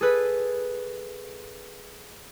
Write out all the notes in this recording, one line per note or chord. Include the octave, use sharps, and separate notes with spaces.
G#4 A4 B4